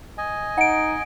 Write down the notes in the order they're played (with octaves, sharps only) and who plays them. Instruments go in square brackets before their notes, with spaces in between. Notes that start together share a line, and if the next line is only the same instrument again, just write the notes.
[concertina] D#5 G#5
[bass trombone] D#4 [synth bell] F#5 D7